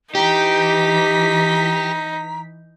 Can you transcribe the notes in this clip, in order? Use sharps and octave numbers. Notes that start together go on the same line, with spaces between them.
E3 D#4 G4 A#5 B6